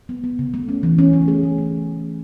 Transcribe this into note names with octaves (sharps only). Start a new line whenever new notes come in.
B3
B3
C#3
A3
C#4
E3
C#4
A3
G#4
A3
A3